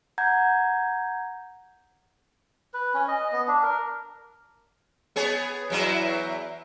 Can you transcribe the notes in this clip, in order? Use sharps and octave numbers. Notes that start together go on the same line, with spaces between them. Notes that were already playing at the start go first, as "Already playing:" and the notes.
F#5 A#5 G6 G#6
B4
C#4
D#5
B3
D4
A#4
B3 G#4 C#5
E2 F#3 E4